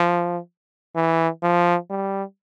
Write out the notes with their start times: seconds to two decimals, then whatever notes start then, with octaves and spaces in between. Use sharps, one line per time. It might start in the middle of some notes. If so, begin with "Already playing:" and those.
Already playing: F3
0.95 E3
1.43 F3
1.90 G3